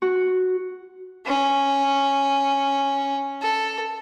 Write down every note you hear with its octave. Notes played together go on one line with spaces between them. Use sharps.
F#4
C#4
A4